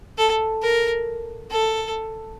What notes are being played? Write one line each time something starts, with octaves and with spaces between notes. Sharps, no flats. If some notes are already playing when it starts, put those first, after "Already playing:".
A4
A#4
A4